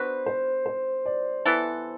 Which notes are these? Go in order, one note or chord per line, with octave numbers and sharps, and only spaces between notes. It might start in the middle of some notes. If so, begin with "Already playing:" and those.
Already playing: B3 D4 F#4 B4 C5
C5
C5
D5
E3 B3 E4 A4